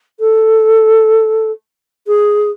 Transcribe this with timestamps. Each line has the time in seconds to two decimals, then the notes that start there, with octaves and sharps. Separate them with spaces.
0.19 A4
2.07 G#4